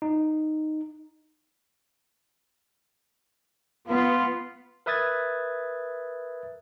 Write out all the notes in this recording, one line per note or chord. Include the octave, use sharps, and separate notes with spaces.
D#4
B3 F4
A#4 B4 E5 D#6 G#6 A6